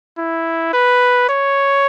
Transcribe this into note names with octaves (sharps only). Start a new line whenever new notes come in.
E4
B4
C#5